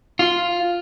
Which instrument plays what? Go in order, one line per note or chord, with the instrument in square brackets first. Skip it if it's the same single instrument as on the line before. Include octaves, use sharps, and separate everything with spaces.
[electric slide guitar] F4